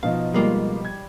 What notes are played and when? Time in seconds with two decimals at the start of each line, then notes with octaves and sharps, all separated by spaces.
0.03 B2 F3 D#4 F5
0.34 G3 G#3 A#3 F4
0.85 G#6